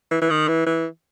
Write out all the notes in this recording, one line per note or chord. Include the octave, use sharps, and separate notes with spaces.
E3
E3
D#3
E3
E3